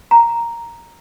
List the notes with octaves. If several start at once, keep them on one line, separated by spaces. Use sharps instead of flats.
A#5